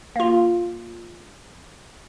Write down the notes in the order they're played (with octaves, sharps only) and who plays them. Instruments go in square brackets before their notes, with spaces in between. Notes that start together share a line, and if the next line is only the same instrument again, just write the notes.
[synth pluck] A#3 F4